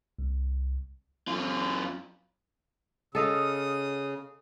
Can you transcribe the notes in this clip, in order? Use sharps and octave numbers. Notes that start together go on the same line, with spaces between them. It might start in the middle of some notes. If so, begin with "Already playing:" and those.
C2
F#2 F4
C#3 A4 D#5 F5 D#6